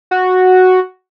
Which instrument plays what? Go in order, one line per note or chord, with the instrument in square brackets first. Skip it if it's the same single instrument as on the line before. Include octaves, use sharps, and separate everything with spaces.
[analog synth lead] F#4